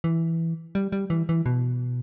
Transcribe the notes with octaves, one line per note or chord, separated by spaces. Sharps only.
E3
G3
G3
E3
E3
B2